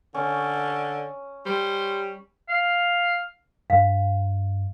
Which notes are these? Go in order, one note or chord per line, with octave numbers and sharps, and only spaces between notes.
D3 C#4
G3 C5
F5
G2 F5